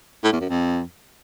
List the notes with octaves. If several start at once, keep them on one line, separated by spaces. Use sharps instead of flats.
A2
E2
F#2
F2